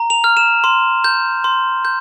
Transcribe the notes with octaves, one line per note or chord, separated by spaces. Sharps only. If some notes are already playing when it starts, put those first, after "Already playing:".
Already playing: A#5
F7
F6
E7
C6
G6
C6
G6